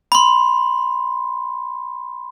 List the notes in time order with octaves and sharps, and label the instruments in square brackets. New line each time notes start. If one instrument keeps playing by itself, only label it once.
[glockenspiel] B5 C6